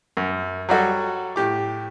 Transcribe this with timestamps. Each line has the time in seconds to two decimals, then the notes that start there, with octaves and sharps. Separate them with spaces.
0.17 F#2
0.69 F#3 G3 F#4 A4
1.36 A2 G4 D6